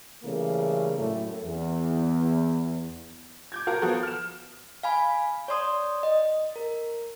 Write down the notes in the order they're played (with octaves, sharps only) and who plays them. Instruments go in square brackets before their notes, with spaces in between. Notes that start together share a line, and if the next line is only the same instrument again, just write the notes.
[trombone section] C#3 E3 G3 A3 A#3
F#2 A2 A3
E2
[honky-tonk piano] D6 G6 G#6
F4 F#4 A#4 F5 A5 A#5
F3 B3 F#4 A4 A#4
F6 E7
[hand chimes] F5 G#5 B5
C#5 D5 C6 D#6
D#5
A#4